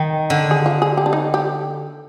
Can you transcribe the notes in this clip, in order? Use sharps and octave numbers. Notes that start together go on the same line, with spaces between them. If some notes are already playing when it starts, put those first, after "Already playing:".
Already playing: D#3
D3
G#4
F4
G#4
G4
D4
D#4
G4